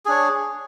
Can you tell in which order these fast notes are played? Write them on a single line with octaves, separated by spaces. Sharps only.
G#4 D4 C#5